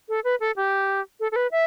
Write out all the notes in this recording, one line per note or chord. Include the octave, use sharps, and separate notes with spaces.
A4
B4
A4
G4
A4
A4
B4
E5